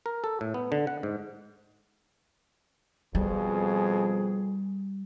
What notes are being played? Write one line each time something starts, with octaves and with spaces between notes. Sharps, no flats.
A#4
A4
A2
B3
D3
F#5
G#2
F2 B2 G3 G#4